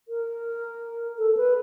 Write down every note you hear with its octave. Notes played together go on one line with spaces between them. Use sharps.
A#4
A4
B4